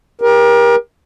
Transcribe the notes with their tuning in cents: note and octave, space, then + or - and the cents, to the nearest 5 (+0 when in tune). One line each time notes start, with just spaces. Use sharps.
G4 +25 A#4 +30